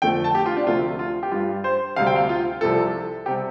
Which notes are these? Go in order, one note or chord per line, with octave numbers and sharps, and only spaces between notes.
F2 D3 F3 A3 G5
A5
G4
F4
D4
D2 C3 F3 A3 F4
F4
G4
G2 G3 F4
C5
D2 C3 G3 F5
G5
F5
F4
C2 C3 F3 A4
C3 G3 G4